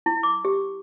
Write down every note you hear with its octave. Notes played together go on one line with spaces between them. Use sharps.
E4
D6
G4